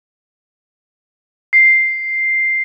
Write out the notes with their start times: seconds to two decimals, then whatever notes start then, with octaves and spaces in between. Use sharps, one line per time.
1.53 C7